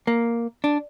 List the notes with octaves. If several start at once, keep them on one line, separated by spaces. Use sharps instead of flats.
A#3
D4